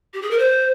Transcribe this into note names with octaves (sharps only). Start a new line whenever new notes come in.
G4
G#4
A#4
C5